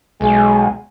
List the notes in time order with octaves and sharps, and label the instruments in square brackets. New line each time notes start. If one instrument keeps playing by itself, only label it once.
[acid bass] B1 [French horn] G#3 [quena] G#5